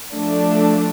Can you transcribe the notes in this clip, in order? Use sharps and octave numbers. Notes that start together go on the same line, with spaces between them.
F3 A3 D4